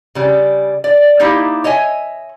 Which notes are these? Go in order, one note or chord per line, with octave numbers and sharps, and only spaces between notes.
C#3 G3
D5
A#3 D#4 E4 G4
C#5 D#5 E5 G#5